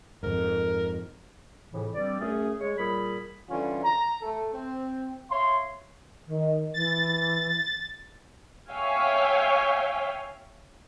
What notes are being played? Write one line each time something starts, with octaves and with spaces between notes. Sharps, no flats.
F2 G#2 A#4
F2 A2 C#3 E3
G2 G3 C4 D5
F#2 A3 C#4 G#4
G#3 C#5
A#2 G3 G#4 B5
D3 E3 G3 C#4 F4
A#5
A3 A4
C4
C#5 E5 F5 C6
D#3
E3 A6
C#5 E5 F5 G5 G#5